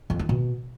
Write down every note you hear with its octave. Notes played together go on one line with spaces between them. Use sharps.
F2
D#3
B2